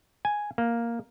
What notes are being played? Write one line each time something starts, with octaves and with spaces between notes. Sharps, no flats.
G#5
A#3